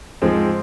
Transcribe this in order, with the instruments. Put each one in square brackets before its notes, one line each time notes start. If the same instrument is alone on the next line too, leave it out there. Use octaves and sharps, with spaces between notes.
[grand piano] G#2 F3 G#3 C4